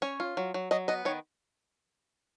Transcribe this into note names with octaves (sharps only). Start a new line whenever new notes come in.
C#4 C#5
F4
F#3
F#3
F#3 D#5
B3 D#5
D#3 C#5